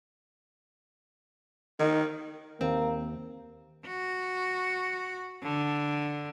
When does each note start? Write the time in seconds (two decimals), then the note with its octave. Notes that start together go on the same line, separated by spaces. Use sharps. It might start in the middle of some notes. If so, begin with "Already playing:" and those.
1.79 D#3 D#4
2.61 D#2 A#3 C4
3.86 F#4
5.43 D3